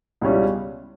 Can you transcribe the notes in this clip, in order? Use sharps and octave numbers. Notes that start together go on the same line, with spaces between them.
C#2 B2 G3 C#4 E4